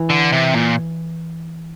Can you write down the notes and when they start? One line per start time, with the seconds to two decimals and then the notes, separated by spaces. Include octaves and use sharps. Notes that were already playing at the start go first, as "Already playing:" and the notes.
Already playing: E3
0.10 D3
0.32 C3
0.55 A#2